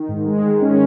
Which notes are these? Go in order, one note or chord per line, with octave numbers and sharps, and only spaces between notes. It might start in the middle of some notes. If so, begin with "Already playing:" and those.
Already playing: D#3
G#2
G#3
D#3
C#4